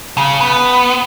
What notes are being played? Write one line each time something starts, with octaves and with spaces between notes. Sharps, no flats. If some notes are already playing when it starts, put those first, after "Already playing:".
C#3
B3